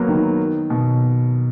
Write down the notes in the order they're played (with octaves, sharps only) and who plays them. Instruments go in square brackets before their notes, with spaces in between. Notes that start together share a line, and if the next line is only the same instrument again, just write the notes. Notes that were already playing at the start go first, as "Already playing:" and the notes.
Already playing: [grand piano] F#3 A#3 B3
D#3
B2